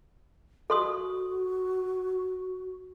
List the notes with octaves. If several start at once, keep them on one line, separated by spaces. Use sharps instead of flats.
F#4 A4 C6 D#6